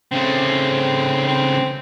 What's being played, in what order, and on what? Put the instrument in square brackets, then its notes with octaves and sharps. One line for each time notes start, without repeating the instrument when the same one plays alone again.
[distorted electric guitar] C#3 A3 [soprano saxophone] C4
[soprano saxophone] C4